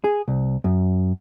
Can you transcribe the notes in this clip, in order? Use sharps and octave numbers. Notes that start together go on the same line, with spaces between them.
G#4
C2
F#2